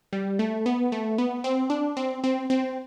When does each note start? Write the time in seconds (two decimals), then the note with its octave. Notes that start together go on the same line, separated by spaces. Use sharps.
0.13 G3
0.39 A3
0.66 B3
0.92 A3
1.18 B3
1.44 C4
1.70 D4
1.97 C4
2.24 C4
2.50 C4